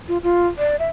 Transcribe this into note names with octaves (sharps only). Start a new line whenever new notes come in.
F4
F4
D5
E5